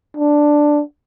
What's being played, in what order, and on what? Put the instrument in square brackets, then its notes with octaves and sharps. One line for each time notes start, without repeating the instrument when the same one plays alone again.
[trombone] D4